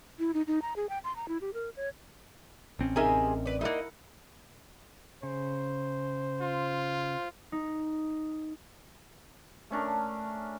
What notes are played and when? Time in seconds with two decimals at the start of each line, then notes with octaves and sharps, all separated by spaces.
0.19 E4
0.34 D#4
0.47 D#4
0.62 A#5
0.76 G#4
0.89 G5
1.04 C6
1.16 A#5
1.28 E4
1.41 G4
1.54 A#4
1.77 C#5
2.79 A1 C4 C#4
2.96 C3 D#4 G#4 A#4 E5 G#5
3.45 B4 D5
3.61 A#3 D#4 E4 A#4 F#5
5.23 C#3 C5
6.41 F4
7.52 D#4
9.70 A3 C#4 D4 A#4